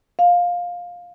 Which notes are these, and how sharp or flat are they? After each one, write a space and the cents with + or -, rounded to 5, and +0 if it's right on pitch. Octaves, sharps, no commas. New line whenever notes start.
F5 +15